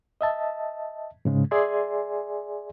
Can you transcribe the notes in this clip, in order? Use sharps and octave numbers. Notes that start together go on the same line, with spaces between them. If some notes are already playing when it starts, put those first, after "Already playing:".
D#5 E5 A5
G#2 C#3 G#3
G#4 D5 E5 G#5 C6